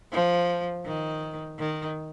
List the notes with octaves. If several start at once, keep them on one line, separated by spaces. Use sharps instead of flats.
F3
D#3
D#3